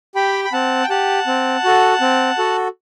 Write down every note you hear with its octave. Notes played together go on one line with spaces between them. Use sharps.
G4 G5 B5
B5
C4 F#5 A5
G5
G4 F#5 A5
C4
F#4 A4
C4
F#4 A4